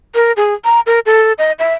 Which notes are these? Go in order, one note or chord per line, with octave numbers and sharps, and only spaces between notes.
A#4
G#4
A#5
A#4
A4
D#5
E5